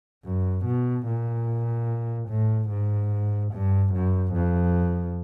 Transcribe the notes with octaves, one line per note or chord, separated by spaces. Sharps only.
F#2
B2
A#2
A2
G#2
G2
F#2
F2